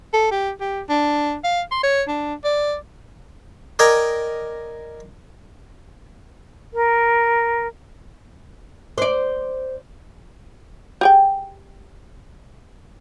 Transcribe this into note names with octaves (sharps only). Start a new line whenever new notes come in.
A4
G4
G4
D4
F5
C6
C#5
D4
D5
A#4 D5 D#5 G5 G#5 A#5
A#4
C5 D5
G4 G#4 G5